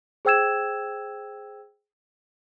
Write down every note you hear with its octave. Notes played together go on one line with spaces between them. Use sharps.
G#4 C5 G5 E6 G#6 E7